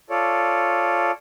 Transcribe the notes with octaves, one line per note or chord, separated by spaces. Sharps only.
F4 A4 C#5 D5